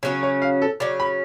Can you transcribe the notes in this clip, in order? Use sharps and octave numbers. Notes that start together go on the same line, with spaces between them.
C#3 F#3 C#4 C#5
C#5
F5
A4
C#3 F#3 C#4 D5
B5